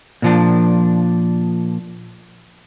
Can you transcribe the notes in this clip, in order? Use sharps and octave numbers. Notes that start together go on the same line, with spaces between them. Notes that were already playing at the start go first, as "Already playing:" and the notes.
A#2 F3 D4